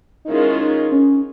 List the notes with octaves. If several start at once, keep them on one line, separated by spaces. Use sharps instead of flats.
D#4
D#3 G#3 C#4 E4 F4 G#4
D#4
C#4